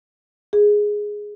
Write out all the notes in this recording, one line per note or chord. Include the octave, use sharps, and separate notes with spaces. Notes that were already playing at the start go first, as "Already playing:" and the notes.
G#4